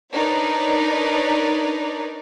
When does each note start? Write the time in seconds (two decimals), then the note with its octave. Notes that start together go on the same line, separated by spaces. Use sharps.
0.12 D4 D#4 A#4 B4 C#5 D5